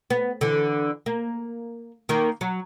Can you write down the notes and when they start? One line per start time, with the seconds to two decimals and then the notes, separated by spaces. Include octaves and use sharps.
0.10 B3
0.41 D3 E3
1.06 A#3
2.09 D#3 A#3 A#4
2.41 F#3